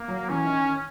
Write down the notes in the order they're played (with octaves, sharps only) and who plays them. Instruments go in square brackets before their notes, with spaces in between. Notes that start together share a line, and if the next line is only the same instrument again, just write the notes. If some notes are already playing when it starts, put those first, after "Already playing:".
Already playing: [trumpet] A#3
[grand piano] F#3
[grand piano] E3 [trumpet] C#4
[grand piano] D#3